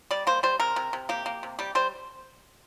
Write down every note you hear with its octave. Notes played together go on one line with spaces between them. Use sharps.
G3 D5
A#3 C5
G3 C5
C3 A#4
C3
C3
A#3 G4
A#3
C3
G3 G4
G3 C5